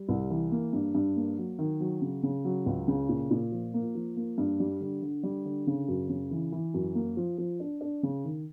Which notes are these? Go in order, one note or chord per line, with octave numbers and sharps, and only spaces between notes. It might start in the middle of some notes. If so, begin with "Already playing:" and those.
Already playing: G3
C2
E3
A#3
G2
G2
A#3
F#3
D#3
F#3
C#3
C#3
F#3
C#2
C#3
A#2
A#2
F3
A#3
F3
A#3
G2
G3
D3
D3
G3
D3
C#3
F#2
C#3
E3
E3
F#2
A#3
F3
F3
D4
D4
C#3
D#3